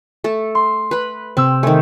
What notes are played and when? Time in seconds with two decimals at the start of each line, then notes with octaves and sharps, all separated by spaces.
0.24 A3 A4
0.55 C6
0.91 B4 B5
1.37 C3 C4 E6
1.63 D#3 A3 G#5